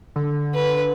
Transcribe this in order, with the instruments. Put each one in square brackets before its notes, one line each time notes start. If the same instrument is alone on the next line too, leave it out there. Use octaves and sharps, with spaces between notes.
[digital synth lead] D3
[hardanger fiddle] B4